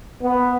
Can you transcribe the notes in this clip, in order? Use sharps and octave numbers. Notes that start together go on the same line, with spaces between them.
B3